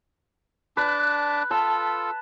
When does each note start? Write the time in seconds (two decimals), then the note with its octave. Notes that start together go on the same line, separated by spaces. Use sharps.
0.77 D4 B4 A5 D6
1.51 F4 A4 A5